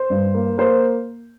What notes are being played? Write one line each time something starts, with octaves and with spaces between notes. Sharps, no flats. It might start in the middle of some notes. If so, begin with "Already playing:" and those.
Already playing: C5
G2
A#3
A#3 C5